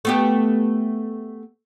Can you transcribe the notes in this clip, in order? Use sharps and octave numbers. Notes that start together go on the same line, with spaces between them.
A3 B3 G4